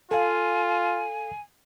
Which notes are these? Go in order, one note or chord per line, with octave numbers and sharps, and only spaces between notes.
F4 A4 F5 G#5